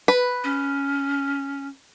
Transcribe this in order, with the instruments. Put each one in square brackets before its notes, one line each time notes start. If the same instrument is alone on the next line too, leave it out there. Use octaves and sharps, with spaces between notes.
[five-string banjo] B4
[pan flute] C#4